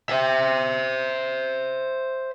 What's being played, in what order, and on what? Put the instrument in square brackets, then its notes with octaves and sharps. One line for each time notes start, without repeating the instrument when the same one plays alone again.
[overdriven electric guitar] C5 E5